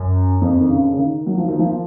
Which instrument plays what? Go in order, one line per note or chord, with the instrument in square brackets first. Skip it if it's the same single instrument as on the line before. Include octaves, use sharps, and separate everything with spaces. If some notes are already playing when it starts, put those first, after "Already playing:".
Already playing: [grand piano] F#2
F2
D#3
C#3
C#3
D#3
F#3
F3
D#3
F3